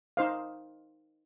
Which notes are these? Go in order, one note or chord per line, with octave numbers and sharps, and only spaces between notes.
D#4 C5 F5